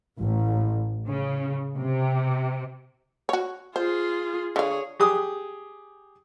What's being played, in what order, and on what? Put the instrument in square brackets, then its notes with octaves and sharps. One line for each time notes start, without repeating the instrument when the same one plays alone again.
[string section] A1
C#3
C3
[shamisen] F#4 C#5
[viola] F4 G#4 [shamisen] C5
[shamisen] D3 F5 [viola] G#4 C#5
[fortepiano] G4 G#4 D#6